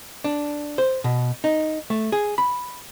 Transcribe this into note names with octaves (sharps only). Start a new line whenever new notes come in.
D4
C5
B2
D#4
A3
G#4
B5